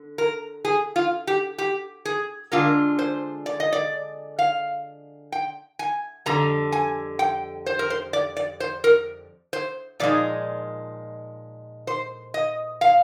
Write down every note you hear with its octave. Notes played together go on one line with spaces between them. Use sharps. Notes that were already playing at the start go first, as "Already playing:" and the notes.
Already playing: D3
A#4
G#4
F4
G4
G4
G#4
D3 G#3 D4 F4 A#4
C5
D5
D#5
D5
F5
G5
G#5
F2 D3 G3 A#5
G#5
G5
C5
A#4
C5
D5
D5
C5
A#4
C5
A#2 F3 G#3 D#4 D5
C5
D#5
F5